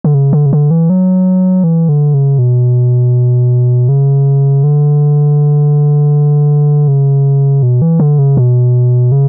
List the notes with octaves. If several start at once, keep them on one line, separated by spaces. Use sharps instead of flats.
D3
C#3
D3
C#3
D3
E3
F#3
E3
D3
C#3
B2
C#3
D3
C#3
B2
E3
D3
C#3
B2
C#3